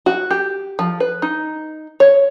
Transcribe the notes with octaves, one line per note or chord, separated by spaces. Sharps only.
F#4
G4
F3
B4
D#4
C#5